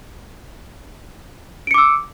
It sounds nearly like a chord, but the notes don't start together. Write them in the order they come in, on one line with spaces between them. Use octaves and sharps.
D7 C#7 D6 E6